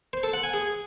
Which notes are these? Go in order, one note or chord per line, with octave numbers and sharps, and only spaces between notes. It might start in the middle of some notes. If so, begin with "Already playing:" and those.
C5
A4
F#5
G#5
G#4